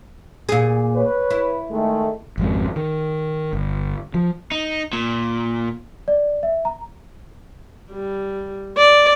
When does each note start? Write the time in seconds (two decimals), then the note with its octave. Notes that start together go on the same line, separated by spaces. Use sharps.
0.49 A#2 G#4
0.95 B4 C#5
1.30 E4
1.71 D#3 G#3 A3
2.38 G#1 F2 G#3
2.76 D#3
3.53 G1
4.14 F3
4.51 D#4
4.93 A#2
6.08 D5
6.43 E5
6.65 A#5
7.91 G3
8.77 D5